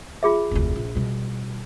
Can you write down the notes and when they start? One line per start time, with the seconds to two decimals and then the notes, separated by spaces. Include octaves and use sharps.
0.23 F4 G#4 E5
0.51 F1 D2
0.75 A#1
0.95 B2 G3